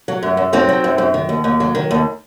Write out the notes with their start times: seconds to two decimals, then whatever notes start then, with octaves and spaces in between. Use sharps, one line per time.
0.08 F#3
0.23 F#2
0.37 F#2
0.53 F#3 C4 D#4
0.69 F#3
0.84 F#2
0.98 F#2
1.14 D#3
1.29 D#2
1.44 D#2
1.60 F#3
1.75 D#3
1.91 D#2